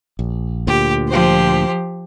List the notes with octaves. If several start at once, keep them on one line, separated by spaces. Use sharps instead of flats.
A#1
D2 A#2 G4
F3 G4 C5